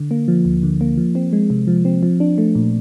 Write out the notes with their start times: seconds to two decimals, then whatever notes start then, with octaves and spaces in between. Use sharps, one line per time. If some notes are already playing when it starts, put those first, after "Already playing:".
Already playing: D3
0.11 A#3
0.28 F3
0.45 D2
0.63 D3
0.81 A#3
0.97 F3
1.15 C4
1.33 G#3
1.50 C3
1.67 F3
1.85 C4
2.03 F3
2.20 D4
2.38 A3
2.55 A#2